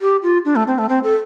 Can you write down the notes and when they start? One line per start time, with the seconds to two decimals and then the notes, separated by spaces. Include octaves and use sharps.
0.01 G4
0.23 F4
0.45 D4
0.56 A3
0.67 C4
0.78 A3
0.89 C4
1.04 A4